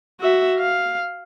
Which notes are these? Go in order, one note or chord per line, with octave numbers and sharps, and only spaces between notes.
F#4 E5
F5